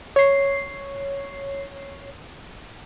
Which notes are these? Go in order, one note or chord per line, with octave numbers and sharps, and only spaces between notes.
C#5 C7